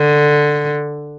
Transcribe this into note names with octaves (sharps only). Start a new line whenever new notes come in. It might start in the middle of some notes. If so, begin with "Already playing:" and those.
Already playing: D3